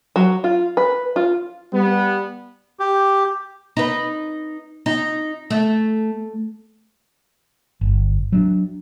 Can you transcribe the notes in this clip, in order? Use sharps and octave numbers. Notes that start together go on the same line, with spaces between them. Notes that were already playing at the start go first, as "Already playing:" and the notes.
F#3
F4
B4
F4
G3 B3
G4
D#4 B4
D#4
A3
G1
F#3 C#4 D4